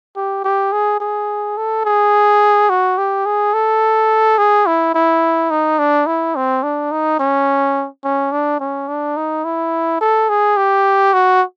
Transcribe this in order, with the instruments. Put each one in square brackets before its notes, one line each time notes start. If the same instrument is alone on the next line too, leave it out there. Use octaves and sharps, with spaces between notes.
[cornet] G4
G4
G#4
G#4
A4
G#4
F#4
G4
G#4
A4
G#4
E4
E4
D#4
D4
E4
C4
D4
D#4
C#4
C#4
D4
C#4
D4
D#4
E4
A4
G#4
G4
F#4